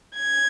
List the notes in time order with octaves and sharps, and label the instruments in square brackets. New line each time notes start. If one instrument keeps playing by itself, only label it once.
[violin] G#6